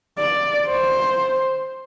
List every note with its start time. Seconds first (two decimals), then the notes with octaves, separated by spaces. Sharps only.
0.18 D5
0.68 C5